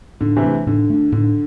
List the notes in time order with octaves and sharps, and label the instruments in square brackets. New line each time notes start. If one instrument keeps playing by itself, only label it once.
[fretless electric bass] A2 [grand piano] D3
[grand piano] C3 E3
[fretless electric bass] A3 D4
[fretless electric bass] A2 [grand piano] D3
[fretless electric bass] A3 D4
[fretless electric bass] A2 [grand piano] D3